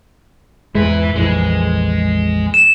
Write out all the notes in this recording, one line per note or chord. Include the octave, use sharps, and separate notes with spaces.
E2 G#2 G#3 E4 B4
A#1 F2 E3 G#3
E7